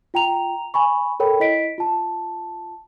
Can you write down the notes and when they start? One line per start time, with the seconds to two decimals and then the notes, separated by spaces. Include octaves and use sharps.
0.14 F4 G5 A#5 F7
0.74 G#5 B5 C#6
1.20 A4 A#4 C#5 G5 B5
1.40 E4 D#5 B6 D7
1.78 F4 A5